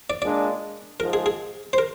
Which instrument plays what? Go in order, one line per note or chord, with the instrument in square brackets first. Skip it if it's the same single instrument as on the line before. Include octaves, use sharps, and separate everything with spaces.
[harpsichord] D5
[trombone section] A#2 G#3 D4 [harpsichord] D5
[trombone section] G#2 F3 G#3 [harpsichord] A#4
[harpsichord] G#4
G#4
C5
A#4